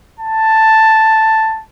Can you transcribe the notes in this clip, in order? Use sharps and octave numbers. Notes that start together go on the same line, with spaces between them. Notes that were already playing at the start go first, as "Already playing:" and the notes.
A5